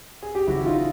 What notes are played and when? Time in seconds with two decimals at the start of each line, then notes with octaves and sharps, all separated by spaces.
0.23 G#4
0.35 G4
0.47 F#1 E4 F#4
0.65 D#4 F4
0.75 E3